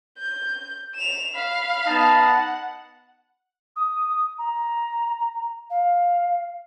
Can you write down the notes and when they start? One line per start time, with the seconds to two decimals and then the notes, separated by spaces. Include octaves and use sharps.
0.18 G6
0.95 E7 F7
1.35 F5 B5
1.87 B3 D#4 A5
2.20 F#5
3.76 D#6
4.38 A#5
5.70 F5